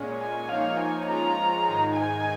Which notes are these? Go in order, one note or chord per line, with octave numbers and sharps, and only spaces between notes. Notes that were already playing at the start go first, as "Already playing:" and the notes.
Already playing: A#2 G#3 C#4
G#5
F3 A#3 D#4 C#5 F5
G#5
F3 G#3 C#4 F4 A#5
G#2 D#3 G#3 D#4
G#5